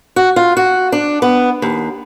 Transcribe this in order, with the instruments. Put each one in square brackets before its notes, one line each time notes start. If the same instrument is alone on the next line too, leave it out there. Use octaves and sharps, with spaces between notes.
[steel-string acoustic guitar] F#4
F4
F#4
D4
B3
D#2